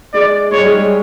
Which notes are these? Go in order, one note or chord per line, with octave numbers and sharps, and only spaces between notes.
G#3 D5
G#3 C#5
G3
G#3
G#3